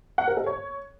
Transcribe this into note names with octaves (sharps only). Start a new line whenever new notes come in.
F#5
A#4
A4
C#5